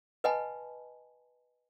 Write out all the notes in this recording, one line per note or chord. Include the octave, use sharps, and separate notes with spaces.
B4 D#5 F#5 G#5 A5 B5